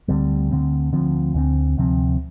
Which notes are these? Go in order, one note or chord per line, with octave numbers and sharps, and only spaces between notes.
D2 D3 G3 C4
D2 D3 G3 C4
D2 D3 F3 C4
D2 D3 F3 C4
D2 C3 F3 C4